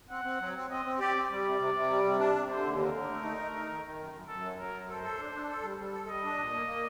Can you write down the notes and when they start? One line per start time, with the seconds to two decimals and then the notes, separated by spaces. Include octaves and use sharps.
0.10 C4 F#5
0.25 C4
0.40 F#3
0.56 C4
0.70 C4 D#5
0.85 C4
0.99 G4 D5
1.14 C4
1.30 G3 D5
1.44 C3
1.59 C3
1.74 C3
1.90 G3
2.04 C3
2.19 D4
2.35 C3
2.50 D3 C5
2.65 D#2
2.79 D3 A#4
2.94 D3
3.09 A3
3.24 D#4
3.39 A3
3.54 D#4
3.69 D#3
3.84 D#3
3.99 F#2
4.13 F#2
4.28 F#2 A4
4.44 F#3
4.58 F#3 A#4
4.73 F#2
4.88 A4 C5
5.03 A4
5.18 D4
5.33 D4
5.48 A4
5.62 G3
5.78 G3
5.92 A4
6.07 G3 D#5
6.23 D4
6.38 A#2
6.53 A#3
6.67 A#3